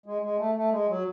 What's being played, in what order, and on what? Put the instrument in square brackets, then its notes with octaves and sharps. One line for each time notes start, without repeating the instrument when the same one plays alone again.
[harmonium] G#3
G#3
A3
A3
G#3
F#3